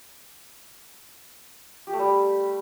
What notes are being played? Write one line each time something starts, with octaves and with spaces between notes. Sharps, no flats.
G4
A3
G3